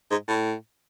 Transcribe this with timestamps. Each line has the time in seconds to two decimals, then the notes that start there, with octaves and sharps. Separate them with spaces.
0.11 G#2
0.28 A2